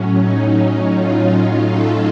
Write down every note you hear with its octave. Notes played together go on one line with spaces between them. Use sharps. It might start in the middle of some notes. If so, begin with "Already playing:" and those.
Already playing: A2 F#3 C#4
D#4
C#4 F4
F4 A4